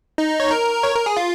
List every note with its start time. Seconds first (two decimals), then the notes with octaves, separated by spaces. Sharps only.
0.18 D#4
0.40 C#5
0.51 A#4
0.83 C#5
0.95 A#4
1.06 G#4
1.17 F4